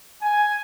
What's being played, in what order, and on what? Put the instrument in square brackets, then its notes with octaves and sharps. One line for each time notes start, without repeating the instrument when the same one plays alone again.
[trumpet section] G#5